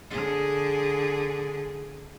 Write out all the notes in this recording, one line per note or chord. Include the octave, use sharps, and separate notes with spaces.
D3 G#4